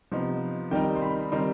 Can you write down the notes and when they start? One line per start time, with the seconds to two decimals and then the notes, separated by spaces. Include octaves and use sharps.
0.12 C3 F3 B3 D#4
0.71 D#3 G3 C4 D#4 G5
0.96 C6
1.02 B5
1.32 D#3 G3 C4 D#4 C6